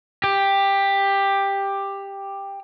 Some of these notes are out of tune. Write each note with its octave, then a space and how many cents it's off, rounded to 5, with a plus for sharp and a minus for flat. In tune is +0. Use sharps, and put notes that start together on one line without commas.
G4 +10